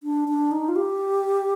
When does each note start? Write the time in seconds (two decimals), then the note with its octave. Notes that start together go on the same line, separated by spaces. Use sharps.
0.03 D4
0.28 D4
0.51 D#4
0.69 F4
0.76 G4